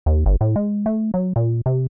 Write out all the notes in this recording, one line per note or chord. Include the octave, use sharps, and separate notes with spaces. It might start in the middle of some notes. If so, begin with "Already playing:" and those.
D#2
G1
A2
G#3
A3
F#3
A#2
C3